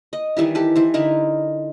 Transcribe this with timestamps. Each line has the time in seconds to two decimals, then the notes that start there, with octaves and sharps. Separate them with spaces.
0.13 D#5
0.37 D#3 E3 G3 E4
0.55 G4 A4 B4
0.76 E3 C5
0.94 D3 D#4 E4 A#4